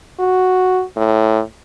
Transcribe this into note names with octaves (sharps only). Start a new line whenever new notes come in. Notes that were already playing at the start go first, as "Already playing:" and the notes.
F#4
A2